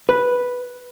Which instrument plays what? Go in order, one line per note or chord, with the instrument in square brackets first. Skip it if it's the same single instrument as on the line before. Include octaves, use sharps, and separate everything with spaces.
[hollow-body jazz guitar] B4